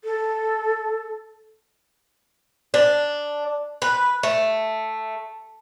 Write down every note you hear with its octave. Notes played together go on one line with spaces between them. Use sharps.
A4
D4
B4
A3